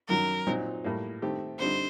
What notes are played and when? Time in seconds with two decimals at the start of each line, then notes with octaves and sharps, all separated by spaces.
0.09 F#2 D#3 F#3 A#4
0.47 A#2 F#3 C4 D#4
0.84 A2 G3 A#3
1.22 D#3 A3 C4 G4
1.60 D3 G3 C4 D#4 C5